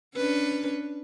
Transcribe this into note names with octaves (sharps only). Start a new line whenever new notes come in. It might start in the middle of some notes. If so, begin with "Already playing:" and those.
C#4 D4 B4